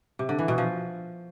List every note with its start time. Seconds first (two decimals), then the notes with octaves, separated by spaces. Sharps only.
0.19 C3
0.29 D3
0.39 E3
0.48 B2
0.58 F3